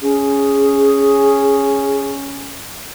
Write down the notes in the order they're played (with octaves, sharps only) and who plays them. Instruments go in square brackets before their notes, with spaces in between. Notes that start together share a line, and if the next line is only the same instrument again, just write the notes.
[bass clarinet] C#4 [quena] G#4